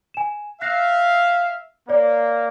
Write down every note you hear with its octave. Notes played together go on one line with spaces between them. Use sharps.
G#5 E7
E5 F5 F#6 A#6 C7
A#3 C#5 D5